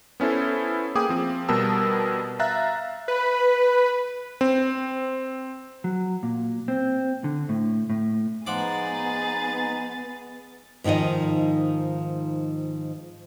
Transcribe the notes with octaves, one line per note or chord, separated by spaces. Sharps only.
B3 C#4 E4 A4 C5
A#3 G#4 G5 D6 D#6
F3 C4
B2 G3 B3 A#4 A5 E6
E5 F5 A#5 F#6 A6
B4
C4
F#3
A#2
C4
D3
A2
A2
F3 G#3 B3 D#4 G#4 F#5 D6 A6
G#2 D#3 F3 D#4 D#5